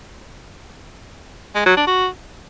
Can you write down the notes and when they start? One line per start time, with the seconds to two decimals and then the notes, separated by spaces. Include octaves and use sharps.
1.55 G#3
1.66 F#3
1.77 D4
1.87 F#4